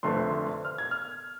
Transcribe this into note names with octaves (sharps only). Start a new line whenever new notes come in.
F1 F2 D3 A3 C4 C6
F6
G#6
F6